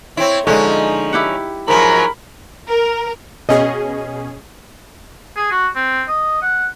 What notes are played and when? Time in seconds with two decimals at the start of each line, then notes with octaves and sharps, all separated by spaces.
0.17 C4 E4 C#5
0.47 D3 F3 G#3 C#4 D#4
1.13 E4 G4 F#5
1.68 G#2 F3 F#3 A#4 B5
2.69 A#4
3.49 B2 C#4 G#4 D#5
5.36 G#4
5.51 F#4
5.76 C4
6.08 D#5
6.42 F#5